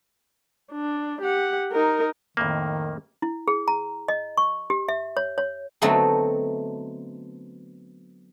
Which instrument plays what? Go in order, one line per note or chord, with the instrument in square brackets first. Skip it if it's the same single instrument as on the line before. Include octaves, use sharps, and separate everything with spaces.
[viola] D4
G4 F#5
D#4 A#4
[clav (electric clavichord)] F2 A2 A#3 [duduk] D#3
[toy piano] E4
G#4
A#5
D#5
C#6
G4
E5
C#5
C#5
[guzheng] D3 F#3 A3 B3 C4 D#4